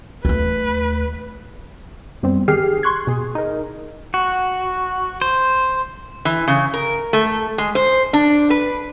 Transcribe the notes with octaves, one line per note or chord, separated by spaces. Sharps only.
D#2 A3 B4
F#2 G3 B3 C4
D#3 G4 G#4 F6 C7
C6 C#6 F#6 G#6
B2 G#4
D#4 A#4
F#4
C5
E3
C#3
A#4
A3
G#3
C5
D4
B4